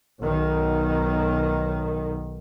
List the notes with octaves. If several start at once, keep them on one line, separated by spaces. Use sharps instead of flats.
B1 D#3